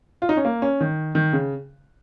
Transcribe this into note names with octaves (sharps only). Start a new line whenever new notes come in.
F4
D#4
C#4
A#3
C#4
D#3
D#3
C#3